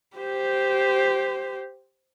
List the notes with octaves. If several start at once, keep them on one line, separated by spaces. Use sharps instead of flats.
G4 C5